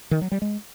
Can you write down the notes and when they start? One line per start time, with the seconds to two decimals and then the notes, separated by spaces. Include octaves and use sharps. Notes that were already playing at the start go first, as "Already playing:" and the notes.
0.11 D#3
0.21 F#3
0.32 G3
0.42 G#3